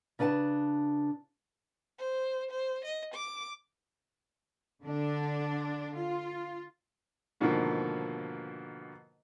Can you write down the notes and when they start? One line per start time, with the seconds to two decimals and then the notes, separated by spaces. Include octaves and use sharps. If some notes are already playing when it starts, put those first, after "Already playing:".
0.19 C#3 D4 B4 F#5 A5
1.99 C5
2.51 C5
2.85 D#5
3.14 D6
4.83 D3 D4
5.97 F4
7.41 G#2 B2 D3 D#3 F3 A#3